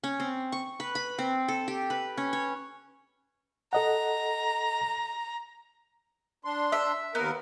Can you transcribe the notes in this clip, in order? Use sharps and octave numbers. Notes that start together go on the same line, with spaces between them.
C#4
C4
C#6
B4
B5
C4
A4
G4
B4
C#4
C#5
A4 D#5 F#5 A#5
D4 C6
E5
D#2 B3 A#4